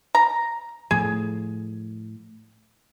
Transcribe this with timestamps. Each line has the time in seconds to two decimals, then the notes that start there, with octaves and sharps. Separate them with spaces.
0.15 A#5
0.91 A2 F3 G#4